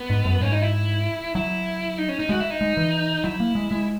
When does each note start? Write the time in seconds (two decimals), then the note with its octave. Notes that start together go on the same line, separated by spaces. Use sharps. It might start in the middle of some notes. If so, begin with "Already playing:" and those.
Already playing: B3
0.10 G#2
0.25 F#2
0.41 G#2 C#4
0.52 D#4
0.62 E4
1.35 F#3 E4
1.98 D#4
2.09 C#4
2.19 D#4
2.29 G#3 F#4
2.40 E4
2.50 D#4
2.61 G#3
2.77 E3
3.24 F#3 E4
3.40 A#3
3.55 G#3
3.71 G#3